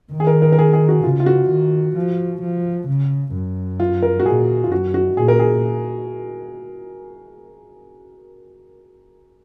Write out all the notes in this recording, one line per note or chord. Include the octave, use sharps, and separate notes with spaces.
D#3
G#4
A#4
A#4
A#4
G#4
G#4
F#4
C#3 F4
F4
F#4
D#3
F3
F3
C#3
F#2
F4
A#4
F#4
A#2 G#4
F4
F#2 F#4
F#4
A#2 G#4
A#4
G#4